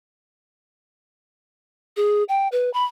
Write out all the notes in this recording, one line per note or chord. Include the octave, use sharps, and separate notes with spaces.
G#4
G5
B4
B5